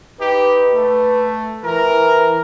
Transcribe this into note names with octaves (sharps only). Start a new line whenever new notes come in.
D#4 G4 B4
A3
E3 A#4